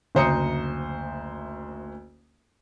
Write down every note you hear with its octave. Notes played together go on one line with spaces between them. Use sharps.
F#1 D2 C5 A#5 D#6 C#7